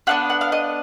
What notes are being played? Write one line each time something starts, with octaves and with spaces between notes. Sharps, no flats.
B3 D4 F4 F#5
F#5
F5
D#5